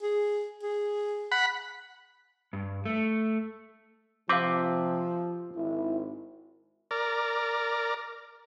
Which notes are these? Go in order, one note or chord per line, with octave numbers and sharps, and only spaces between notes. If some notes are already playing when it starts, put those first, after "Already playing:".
G#4
G#4
F#5 B5
G2
A3
C3 F3 C4 B4 F5 D6
G#1 E4
A#4 D5